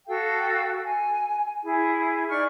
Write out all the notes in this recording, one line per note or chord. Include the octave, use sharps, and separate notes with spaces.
F#4 A4 F5 G5
G#5
E4 G#4
D#4 D5 C#6 F6